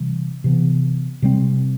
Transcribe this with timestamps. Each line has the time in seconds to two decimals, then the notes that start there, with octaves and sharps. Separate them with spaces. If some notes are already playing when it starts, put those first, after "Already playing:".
Already playing: C3 E3 G3
0.44 C3 E3 B3
1.22 C3 G3 C4